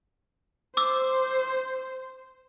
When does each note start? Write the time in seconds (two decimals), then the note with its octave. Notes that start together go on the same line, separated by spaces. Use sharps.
0.77 C5 D6 E6